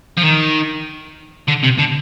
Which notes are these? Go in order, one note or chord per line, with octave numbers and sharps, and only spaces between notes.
F3
D#3
D3
C3
D3